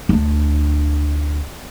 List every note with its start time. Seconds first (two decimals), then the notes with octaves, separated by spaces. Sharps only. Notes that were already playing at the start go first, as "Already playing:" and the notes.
0.09 D2 D4